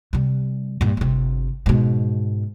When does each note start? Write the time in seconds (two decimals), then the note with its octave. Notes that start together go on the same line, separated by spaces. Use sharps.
0.13 C3 G3
0.81 G2 A#2
0.97 G1 C3
1.66 G#2 B2